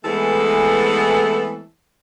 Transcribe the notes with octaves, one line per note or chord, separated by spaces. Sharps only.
E3 G#3 A3 B3 C4 A4